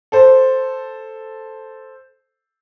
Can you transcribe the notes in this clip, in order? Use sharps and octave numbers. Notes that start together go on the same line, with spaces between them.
A4 C5